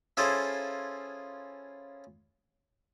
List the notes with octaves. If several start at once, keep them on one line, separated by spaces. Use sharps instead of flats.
C#4 E4 F4 G#4 A4 C5